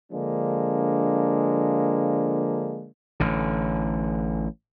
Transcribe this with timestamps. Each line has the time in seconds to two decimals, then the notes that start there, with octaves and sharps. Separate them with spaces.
0.12 D3 F3 G#3 A#3 D4
3.20 A1 D3